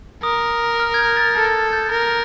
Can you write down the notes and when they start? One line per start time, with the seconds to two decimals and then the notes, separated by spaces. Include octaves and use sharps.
0.23 A#4 D#6
0.80 F6
0.94 G#6
0.99 G6
1.17 A6
1.35 A4 A6
1.73 G6
1.91 A#4